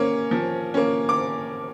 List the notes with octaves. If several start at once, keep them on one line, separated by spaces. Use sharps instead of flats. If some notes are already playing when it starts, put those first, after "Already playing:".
Already playing: A#3 C#4
F3
A#3 C#4
D6